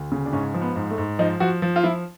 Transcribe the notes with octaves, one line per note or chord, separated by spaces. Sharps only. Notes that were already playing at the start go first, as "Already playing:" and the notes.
Already playing: D2
C#3
D4
G#2 C#4
F3
B3
G#2
A3
G#2
F3 D#4
F3 F#4
F3
F4
F3 E4